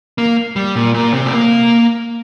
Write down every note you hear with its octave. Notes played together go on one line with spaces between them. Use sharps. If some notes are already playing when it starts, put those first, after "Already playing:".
A#3
G3
A#2
A#2
C3
A3
A#3